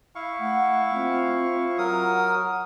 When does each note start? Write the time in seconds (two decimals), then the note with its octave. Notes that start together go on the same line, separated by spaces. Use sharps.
0.15 E4 F5 C#6
0.39 A3 F#5
0.94 C4 F4
1.78 F#3 A#4 F#5 D#6